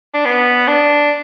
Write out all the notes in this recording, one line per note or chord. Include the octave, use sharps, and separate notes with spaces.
D4
B3
D4